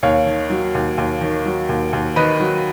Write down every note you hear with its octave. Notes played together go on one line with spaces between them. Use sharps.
D#2 C#5 F5
D#3
F#3
D#2
D#2
D#3
F#3
D#2
D#2
D#3 B4 D#5
F#3